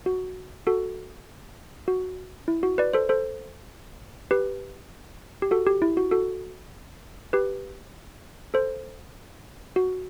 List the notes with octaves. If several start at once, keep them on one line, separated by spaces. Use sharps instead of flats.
F#4
F#4 A4
F#4
E4
F#4
B4 D5
A4 C5
A4 C5
G4 B4
G4
F#4 A4
G4
E4
F#4
F#4 A4
G4 B4
A4 C5
F#4